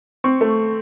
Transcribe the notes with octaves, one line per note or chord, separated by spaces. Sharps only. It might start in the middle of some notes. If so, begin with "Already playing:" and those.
C4 C#6
A3